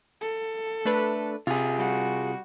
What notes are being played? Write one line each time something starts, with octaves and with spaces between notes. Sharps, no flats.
A4
A3 D4 B4
C3 F4 G#4
G3 F#4